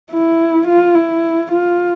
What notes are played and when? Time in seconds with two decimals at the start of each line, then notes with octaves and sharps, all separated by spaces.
0.11 E4
0.67 F4
0.95 E4
1.52 F4